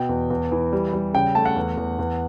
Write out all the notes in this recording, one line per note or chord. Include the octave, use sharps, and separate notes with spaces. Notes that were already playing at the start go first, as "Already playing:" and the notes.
Already playing: B2 G5
E2
E2
E3
G3
G3
C#3 G5
A3 A5
F#5
E2
E2
E2